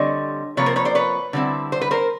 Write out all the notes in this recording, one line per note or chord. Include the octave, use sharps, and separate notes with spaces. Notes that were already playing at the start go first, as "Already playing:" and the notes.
Already playing: D3 G3 C4 C#5 D#5
C3 F3 A#3 B4 C#5
A#4 C5
B4 C#5
C5 D5
B4 C#5
D3 G3 C4 E4
C5
B4
A#4 C5